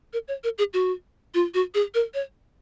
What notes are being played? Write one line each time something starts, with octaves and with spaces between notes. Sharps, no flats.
A#4
C#5
A#4
G#4
F#4
F4
F#4
G#4
A#4
C#5